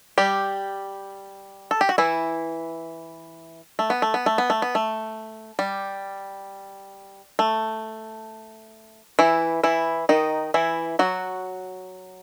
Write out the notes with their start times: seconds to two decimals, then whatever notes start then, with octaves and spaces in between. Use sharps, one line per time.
0.18 G3 G4
1.71 A4
1.81 G4
1.89 F#4
1.98 E3 E4
3.79 A3
3.90 B3
4.02 A3
4.14 B3
4.26 A3
4.38 B3
4.50 A3
4.62 B3
4.75 A3
5.59 G3
7.39 A3
9.19 E3 E4
9.63 E3 E4
10.09 D#3 D#4
10.54 E3 E4
10.99 F#3 F#4